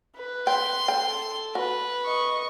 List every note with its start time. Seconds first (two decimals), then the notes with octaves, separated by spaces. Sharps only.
0.17 B4
0.47 G5 C6
0.88 A4 G5
1.55 F#4 B4
2.06 D#5 C#6